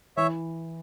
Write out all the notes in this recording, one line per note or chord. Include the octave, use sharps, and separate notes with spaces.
E3 C#5 E5